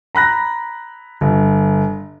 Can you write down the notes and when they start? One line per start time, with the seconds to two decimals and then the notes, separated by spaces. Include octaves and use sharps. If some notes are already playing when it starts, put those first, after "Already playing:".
0.15 A#5 B5 F#6 A#6
1.21 G1